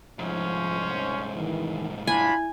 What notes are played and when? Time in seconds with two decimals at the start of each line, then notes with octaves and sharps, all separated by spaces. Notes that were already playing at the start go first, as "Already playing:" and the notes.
0.19 C2 G#2 F3 C#4 C5
1.35 D#3 E3
2.07 D4 E4 F4 G#5 B5